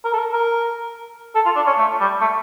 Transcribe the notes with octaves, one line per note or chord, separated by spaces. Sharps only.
A#4
A4
A#4
A#4
A4
F4
D4
C#4
A3
G3
A3